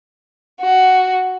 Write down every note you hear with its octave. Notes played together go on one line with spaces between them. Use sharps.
F#4